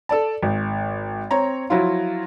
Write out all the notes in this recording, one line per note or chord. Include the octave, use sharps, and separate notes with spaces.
A4 D5 A5
G#1
C4 C#5 A#5
F3 F#3 E4 F4